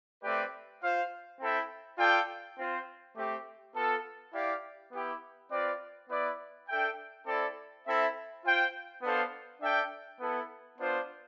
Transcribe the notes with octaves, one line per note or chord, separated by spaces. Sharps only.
A3 C4 G4 B4 D5
F4 C5 F5
C4 E4 A4 E5 G5
F4 A4 D5 G5
C4 F4 C5
A3 C4 G4
B3 F4 A4
E4 G4 D5 F5
B3 E4 G4
C4 F4 B4 D5
B3 E4 B4 D5
D4 A4 E5 G5
C4 E4 A4 D5
C4 E4 A4 E5
F4 C5 G5
B3 D4 A4 C5 F5
D4 A4 E5 G5
B3 E4 A4
B3 D4 F4 C5